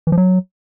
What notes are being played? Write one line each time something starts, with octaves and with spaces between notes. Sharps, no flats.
E3
F3
F#3